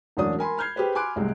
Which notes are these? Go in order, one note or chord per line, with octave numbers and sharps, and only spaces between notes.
E1 A1 F#3 C#4 D4 D#6
A#4 G#5 B5 C6
B5 F6 G6 G#6 C7
G4 G#4 B4 C5
G#5 B5 C6 D6 F#6 D7
C2 A2 C3 G#3